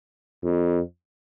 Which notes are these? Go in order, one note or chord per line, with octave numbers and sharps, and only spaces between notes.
F2